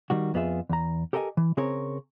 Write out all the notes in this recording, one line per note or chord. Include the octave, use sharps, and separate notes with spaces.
D#3 G3 F#4
F2 B3 F4 G#4 E5
E2 A#5
G4 A4 A#4 D#5 F#5 G#5
E3
C#3 C4 G#4 A#4 C#5